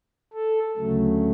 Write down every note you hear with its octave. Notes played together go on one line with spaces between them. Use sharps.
A4
D2 C#3 F#3 A3